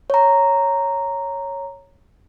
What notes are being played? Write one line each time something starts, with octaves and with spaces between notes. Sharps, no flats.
C#5 A#5